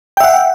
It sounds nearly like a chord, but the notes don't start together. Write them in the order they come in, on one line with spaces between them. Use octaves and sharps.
G5 E5 F#5